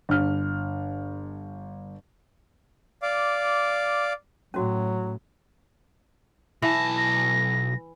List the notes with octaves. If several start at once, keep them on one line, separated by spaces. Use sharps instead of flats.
G1 F6
D5 F5 D6
A2 F#3 C#4 F#4
B1 E3 A5 A#6
A#6